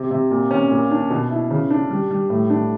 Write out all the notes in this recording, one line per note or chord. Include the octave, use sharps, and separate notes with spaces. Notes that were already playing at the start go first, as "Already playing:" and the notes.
Already playing: C3
C3
A#2
C#4
A#2
D4
B2
E4
C#3
D4
G3
G3
A2
D4